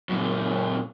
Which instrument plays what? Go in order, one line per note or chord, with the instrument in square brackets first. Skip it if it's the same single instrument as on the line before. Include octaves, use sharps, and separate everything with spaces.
[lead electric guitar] F#2 A#2